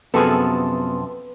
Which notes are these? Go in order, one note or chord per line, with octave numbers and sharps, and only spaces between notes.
F#2 C3 F3 B3 F#4 G#4 A4 B4